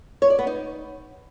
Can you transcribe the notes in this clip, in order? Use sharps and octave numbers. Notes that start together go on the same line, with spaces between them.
C#5
D5
B3
D#4